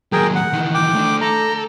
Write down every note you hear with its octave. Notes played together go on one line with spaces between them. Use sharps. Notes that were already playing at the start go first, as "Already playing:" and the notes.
D#2 F#3 G#4 A#4 G5
F#5
D#3 E3
G5 D6
A3 D4
A4 A#5